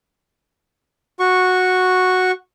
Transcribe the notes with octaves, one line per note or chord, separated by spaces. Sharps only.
F#4 C#6